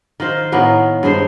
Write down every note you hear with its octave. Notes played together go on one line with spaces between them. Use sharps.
D#3 F4 C5
A2 D#3 A#3 B3
G2 G#3 G#4 C5